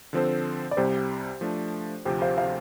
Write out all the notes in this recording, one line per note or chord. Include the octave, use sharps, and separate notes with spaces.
D3 F3 C4 A4 C5
D5
C2 C3 G3 G4 C5
F3 A3 D4
D2 C3 F3 C4 G4 C5
C5 F5
C5 F5